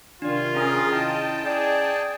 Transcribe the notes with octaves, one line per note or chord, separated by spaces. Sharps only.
C3 D#3 D4 F4 D5
C#4 G#4 A#4
E4 D#5 G5 A5
G#4 D5